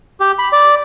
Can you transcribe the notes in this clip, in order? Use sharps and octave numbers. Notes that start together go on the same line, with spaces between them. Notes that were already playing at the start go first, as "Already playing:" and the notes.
G4
B5
D5